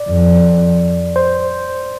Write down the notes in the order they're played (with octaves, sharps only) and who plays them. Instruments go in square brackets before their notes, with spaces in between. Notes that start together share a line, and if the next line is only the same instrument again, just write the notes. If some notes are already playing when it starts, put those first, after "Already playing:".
Already playing: [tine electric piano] D5
[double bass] F2
[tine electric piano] C5